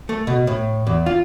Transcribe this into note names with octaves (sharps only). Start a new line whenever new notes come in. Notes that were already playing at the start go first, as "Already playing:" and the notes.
A3
B2
A2
E2
F4